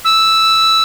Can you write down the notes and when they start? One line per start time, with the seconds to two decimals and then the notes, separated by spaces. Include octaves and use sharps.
0.05 E6